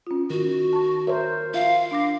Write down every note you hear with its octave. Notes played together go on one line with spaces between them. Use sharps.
C#4 F4
D#3 F#4
A5 C#6
A#4 C5 C#5 E5
F4 E5 F5
D4 D6 A#6